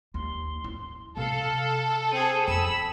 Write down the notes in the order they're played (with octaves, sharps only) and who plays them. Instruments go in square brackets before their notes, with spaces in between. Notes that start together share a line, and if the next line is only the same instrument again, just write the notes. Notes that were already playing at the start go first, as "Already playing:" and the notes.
[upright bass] D#2 [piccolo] C6
[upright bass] E4
[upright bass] C3 [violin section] A4 [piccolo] F5
[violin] C4 G#4 [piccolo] D#7
[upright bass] F2 [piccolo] B5 [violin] E6